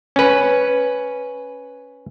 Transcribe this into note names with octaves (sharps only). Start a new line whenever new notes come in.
C#4 B4